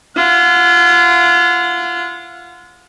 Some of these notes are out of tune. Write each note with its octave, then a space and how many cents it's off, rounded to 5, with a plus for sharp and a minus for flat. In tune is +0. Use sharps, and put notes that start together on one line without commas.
F4 -30 F#5 -35